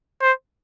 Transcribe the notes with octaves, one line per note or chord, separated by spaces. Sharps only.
C5